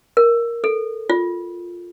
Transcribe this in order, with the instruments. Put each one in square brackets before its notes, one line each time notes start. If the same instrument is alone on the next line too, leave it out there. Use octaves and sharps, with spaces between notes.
[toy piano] A#4
A4
F4